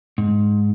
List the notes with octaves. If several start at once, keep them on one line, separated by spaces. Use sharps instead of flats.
G#2